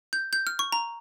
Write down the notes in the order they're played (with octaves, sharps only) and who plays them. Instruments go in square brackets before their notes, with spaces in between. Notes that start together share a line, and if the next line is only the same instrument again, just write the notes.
[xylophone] G6
G6
F6
C#6
A#5